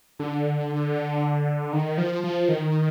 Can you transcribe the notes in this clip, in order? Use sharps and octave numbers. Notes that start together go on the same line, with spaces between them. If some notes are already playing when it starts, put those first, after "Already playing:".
D3
D#3
F3
F3
D#3